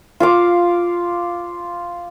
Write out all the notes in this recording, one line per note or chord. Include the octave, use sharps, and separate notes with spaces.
F4 F5 D6